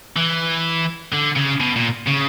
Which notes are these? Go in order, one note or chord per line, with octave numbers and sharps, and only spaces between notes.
E3
D3
C#3
B2
A#2
C#3